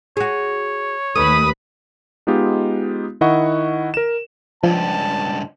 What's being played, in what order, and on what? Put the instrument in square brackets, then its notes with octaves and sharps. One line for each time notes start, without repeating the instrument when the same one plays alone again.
[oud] F#4 G#4 [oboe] C#5
[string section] D#2 B4 B5 [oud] A3 [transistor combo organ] D#6
[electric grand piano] G#3 B3 D#4 F4 G4
D#3 E4 D#5 F#5 C#6
A#4 E7
[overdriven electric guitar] C#2 G2 [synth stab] F3 [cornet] A5